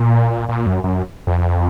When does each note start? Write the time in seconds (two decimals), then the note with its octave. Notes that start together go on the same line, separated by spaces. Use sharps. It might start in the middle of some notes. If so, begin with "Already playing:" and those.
Already playing: A#2
0.49 A#2
0.66 F#2
0.84 F#2
1.27 F2